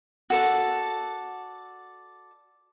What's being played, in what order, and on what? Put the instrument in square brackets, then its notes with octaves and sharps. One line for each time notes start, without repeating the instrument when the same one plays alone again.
[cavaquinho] F#4 A4 D5